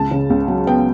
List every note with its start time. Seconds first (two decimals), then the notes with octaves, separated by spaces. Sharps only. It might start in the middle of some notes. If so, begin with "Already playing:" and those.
Already playing: C#2 A5
0.11 C#3
0.30 C#2
0.48 F#3
0.67 B3 G5